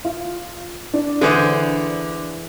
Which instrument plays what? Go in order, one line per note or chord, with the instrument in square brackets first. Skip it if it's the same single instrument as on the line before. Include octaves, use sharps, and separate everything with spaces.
[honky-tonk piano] F4
D4
[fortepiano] D3 [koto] E3 G#4 C5